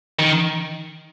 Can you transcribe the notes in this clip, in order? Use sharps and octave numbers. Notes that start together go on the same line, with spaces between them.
D#3